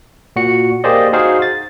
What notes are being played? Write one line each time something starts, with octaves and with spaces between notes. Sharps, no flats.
A#2 F#4 C#7
A#3 G4 G#4 C5 D5 D#5
D#4 F#4 G#4 C5 F5
A6